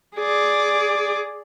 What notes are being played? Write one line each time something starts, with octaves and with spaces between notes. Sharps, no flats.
G#4 D5